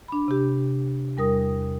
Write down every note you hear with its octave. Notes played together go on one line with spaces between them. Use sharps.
D4 B5
C3 G4
E2 G3 A#4 D#6